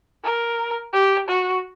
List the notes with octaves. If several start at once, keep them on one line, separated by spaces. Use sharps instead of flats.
A#4
G4
F#4